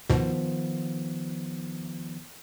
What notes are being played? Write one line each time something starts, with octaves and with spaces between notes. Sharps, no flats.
C#2 G#2 B2 D#3 F3 B3